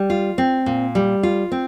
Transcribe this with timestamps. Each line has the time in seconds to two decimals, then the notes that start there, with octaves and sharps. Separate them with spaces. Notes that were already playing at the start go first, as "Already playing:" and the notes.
Already playing: G3
0.10 F4
0.38 C4
0.66 A#2
0.95 G3
1.23 F4
1.51 C4